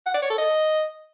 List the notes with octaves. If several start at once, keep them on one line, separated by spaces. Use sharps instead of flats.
F#5
D5
C#5
A4
D#5